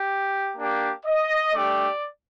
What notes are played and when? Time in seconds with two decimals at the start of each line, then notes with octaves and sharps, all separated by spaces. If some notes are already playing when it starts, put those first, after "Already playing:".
Already playing: G4
0.57 A#3 D4 G4
1.06 D#5
1.53 A3 D4 G4 D5